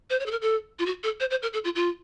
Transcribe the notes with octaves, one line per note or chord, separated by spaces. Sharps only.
C5
C#5
A4
A#4
A4
F4
F#4
A4
C5
C5
A#4
A4
F4
F4